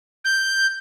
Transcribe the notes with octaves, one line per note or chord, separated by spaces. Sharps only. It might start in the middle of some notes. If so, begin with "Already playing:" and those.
G6